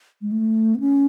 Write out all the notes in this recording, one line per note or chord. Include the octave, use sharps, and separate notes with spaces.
G#3
A3
B3
C#4